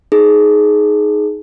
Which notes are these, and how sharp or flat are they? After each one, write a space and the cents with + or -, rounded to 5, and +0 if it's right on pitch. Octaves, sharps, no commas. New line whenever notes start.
D#4 +0 G#4 +15